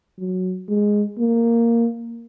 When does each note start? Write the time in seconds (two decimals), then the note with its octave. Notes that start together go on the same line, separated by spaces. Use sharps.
0.19 F#3
0.69 G#3
1.19 A#3